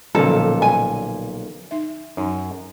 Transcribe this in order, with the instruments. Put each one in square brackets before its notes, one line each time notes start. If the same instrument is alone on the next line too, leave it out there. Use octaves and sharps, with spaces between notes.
[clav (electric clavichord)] B1 A#2 [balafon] D3 F3 C#4 [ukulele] A4
[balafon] D5 G5 [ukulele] G#5
[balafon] D#4 E5
[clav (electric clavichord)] F#2 [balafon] D#4